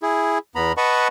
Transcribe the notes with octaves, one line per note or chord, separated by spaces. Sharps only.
E4 G#4
E2 B3 A#5 B5
B4 D#5 F#5 A5 B5 C#6